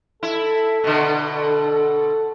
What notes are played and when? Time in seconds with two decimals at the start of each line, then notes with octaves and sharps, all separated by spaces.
0.23 E4 A4
0.84 B2 D3
1.29 A4